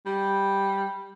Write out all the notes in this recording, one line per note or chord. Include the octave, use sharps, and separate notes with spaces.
G3